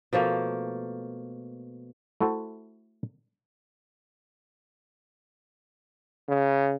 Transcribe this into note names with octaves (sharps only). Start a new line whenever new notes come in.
B2 F3 A3 A#3
A3 E4 F#4 A4 C5
C#3